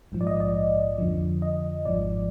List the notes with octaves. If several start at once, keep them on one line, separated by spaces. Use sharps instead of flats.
A#1 G#2 F3
D5
D#5
D5
F2 D3 F3
D#5
G#1 G#2 F3 D5